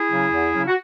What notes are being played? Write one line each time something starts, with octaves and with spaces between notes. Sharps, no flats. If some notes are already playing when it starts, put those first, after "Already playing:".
Already playing: E4 G#4
C#3 F#3 C#4
E2
C#3 F#3 C#4
F#4